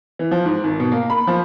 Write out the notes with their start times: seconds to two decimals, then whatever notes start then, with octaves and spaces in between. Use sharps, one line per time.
0.19 E3
0.31 F3
0.46 G#2
0.64 G#1
0.80 B2
0.92 A#3
1.10 B5
1.27 F3